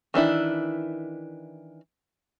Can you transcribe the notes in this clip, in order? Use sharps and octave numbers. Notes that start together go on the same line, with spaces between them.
D#3 E3 D4 E4